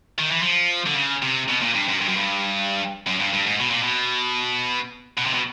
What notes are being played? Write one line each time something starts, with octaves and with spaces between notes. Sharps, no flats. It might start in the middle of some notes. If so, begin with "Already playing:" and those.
D#3
E3
F3
D3
C#3
C3
B2
A#2
G2
F#2
G2
F#2
G2
F#2
G2
G2
G#2
B2
A#2
B2
B2
C3
B2